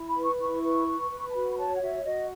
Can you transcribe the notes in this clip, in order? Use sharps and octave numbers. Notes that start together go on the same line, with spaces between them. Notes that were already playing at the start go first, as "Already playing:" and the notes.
Already playing: E4
B5
B4
C#6
E4 C#6
B4
B4
B4
A5
F#4 B5
C#5 A5
F#5
F#4 E5
F#4 D#5